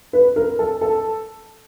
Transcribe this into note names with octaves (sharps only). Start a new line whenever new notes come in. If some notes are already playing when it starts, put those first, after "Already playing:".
B4
A#4
A4
A4